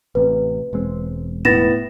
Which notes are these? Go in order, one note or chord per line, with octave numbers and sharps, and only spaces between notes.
A1 C3 B4
E1 G#3 C4
A2 B3 A6 A#6 E7